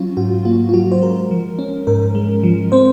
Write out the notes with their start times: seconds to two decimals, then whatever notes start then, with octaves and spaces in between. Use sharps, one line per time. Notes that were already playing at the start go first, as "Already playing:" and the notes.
Already playing: F#3 C#4 F4 F#4
0.17 G#2 F#4
0.45 A#3 F4
0.69 F4
0.74 F#3 F#4
0.92 C5
1.02 G#3 A#4
1.31 F3
1.59 C#4
1.87 G#2 A#4
2.15 G#3
2.43 F3
2.72 C4 C5